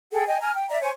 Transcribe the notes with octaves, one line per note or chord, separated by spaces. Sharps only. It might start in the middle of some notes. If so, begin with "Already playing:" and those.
G#4 A4 F#5 G5
D#5 G5 G#5
G#5 A#5 F6
G5
D5 E5 A#5
C5 C#5 G#5 C#6